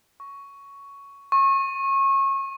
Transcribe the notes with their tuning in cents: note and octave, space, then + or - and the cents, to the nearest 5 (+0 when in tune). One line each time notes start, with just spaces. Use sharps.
C#6 +10
C#6 -30